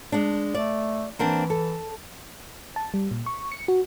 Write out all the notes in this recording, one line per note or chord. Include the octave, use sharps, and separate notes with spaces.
G#3 D4
A3 D5
E3 A#3 C4 D4
A4
A5
G3
A#2
C#6
C#7
F#4